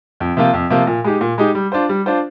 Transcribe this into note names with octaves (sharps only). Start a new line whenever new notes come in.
F2
C3 F3 A#3 F4
F2
C3 F3 A#3 F4
A#2
G#3 D#4 G4
A#2
G#3 D#4 G4
G3
D4 F4 C5
G3
D4 F4 C5